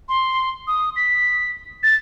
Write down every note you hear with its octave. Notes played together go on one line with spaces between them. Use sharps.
C6
D#6
B6
A6